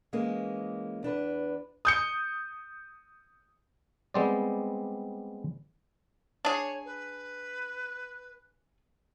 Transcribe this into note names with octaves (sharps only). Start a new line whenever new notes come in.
E3 G#3 A#3 C#4
E2 D4 B4
D#6 G6 C#7
G3 G#3 B3 C4 C5 D5
D4 G#4 C#5
B4